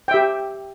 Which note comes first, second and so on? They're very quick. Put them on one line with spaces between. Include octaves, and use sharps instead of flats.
G5 E5 G4